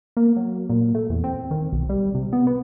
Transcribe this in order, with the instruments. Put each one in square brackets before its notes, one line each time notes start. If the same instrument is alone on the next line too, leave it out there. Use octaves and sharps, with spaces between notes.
[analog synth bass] A#3
F#3
A#2
A3
E2
C4
D#3
B1
G3
C3
B3
B3